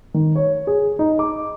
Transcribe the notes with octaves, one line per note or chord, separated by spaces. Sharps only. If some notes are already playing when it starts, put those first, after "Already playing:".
D#3
C#5
G#4
D#4
D6